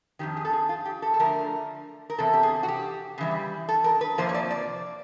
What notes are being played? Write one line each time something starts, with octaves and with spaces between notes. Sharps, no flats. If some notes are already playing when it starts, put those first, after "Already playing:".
F2 C3 D#3 G4
G#4
A4
G#4
F4
G4
A4
A4
D3 F3 A3 A#4
A#4
E2 C3 A4
G4
G#4
F#4
G4
C#3 E3 G3
A4
A#4
B4
F2 C3 F3 A#3 C5
C#5
D5
D5